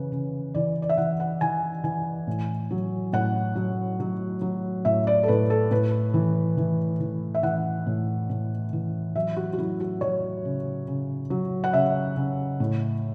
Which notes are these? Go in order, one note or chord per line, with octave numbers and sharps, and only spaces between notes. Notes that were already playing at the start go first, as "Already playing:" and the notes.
Already playing: C#3 E3 B4
C#3
E3 D5
D5
E5
E3 F#5
F#5
E3 G#5
E3 G#5
A2
F#3
A2 F#5
F#3
F#3
F#3
A2 E5
D5
A4
A2 B4
A4
A2 B4
E3
E3
E3
E5
E3 F#5
A2
A2
E3
F#3 E5
F#4
F#4
F#3 E4
F#4
F#3 C#5
C#3
C#3
F#3
F#5
C#3 E5
C#3
A2